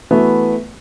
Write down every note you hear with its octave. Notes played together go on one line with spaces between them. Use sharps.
E3 A3 B3 F#4 E5